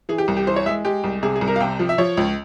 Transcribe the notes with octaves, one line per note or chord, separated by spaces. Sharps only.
E3 G#4
G4
C2
G4
E3 C5
C#5
G#3 E5
G#3 G4
C2
C3 G#4
G#4
C2
A#4
F5
C3 G5
F3
E5
F3 C#5
C#2